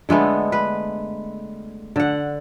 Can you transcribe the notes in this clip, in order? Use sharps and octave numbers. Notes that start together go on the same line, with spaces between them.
D3 G#3 A3 B3
B4
D3 F#5